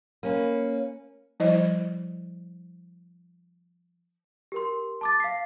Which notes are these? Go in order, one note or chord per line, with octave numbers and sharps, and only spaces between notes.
A#3 C#4 B4
F3 G3 E4 C5 D#5
G4 A#4 C6
A5 D6 A6
F5 B6 C7